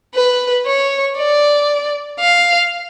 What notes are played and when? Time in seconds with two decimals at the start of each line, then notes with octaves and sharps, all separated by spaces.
0.15 B4
0.66 C#5
1.18 D5
2.20 F5